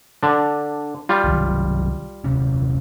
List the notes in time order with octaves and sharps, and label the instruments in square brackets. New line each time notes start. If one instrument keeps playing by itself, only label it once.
[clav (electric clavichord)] D3 D4
G3 F4
[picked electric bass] C2 D#3 F#3
D#1 C3 C#4